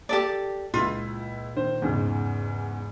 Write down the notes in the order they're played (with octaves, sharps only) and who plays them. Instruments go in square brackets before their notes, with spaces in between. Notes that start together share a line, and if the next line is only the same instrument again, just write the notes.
[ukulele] G4 A4 D5
[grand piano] C#2 E4 [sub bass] A#2 [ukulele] F4
[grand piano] D#3 C5
E2 G#2 C#3